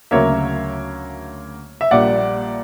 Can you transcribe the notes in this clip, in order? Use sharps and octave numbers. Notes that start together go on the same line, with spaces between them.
D2 C#3 F#3 A#3 C#5 E5
E5
A#1 A#2 G3 D5 F#5